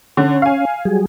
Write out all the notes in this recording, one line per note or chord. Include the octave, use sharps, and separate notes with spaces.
D3 C#4
F5 G#5
F#3 G3 G#4